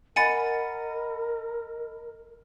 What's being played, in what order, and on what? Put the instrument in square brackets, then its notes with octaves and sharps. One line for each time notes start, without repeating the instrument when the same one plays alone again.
[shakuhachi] A#4 [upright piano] D#5 B5 [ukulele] F#5 G#5 [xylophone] A6 C#7 D#7